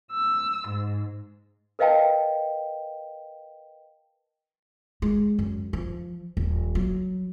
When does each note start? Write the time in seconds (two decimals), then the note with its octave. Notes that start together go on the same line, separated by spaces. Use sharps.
0.12 E6
0.67 G#2
1.79 A#4 B4 D#5 F5 G5 A5
5.02 G#3
5.39 F#2
5.73 F3
6.37 D#1
6.75 F#3